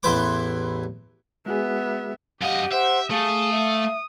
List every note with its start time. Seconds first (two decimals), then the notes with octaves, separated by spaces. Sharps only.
0.03 A1 E2 E4 B4 C6 D6
1.46 G#3 B3 F#4 G#4 E5
2.42 F#2 G4 D#5 F5 F#5
2.72 C5 E5 F#5
3.11 A3 G#4 F5 D#6
3.52 E5